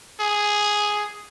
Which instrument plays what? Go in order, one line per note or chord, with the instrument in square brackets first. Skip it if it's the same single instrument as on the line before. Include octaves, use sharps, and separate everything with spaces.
[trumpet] G#4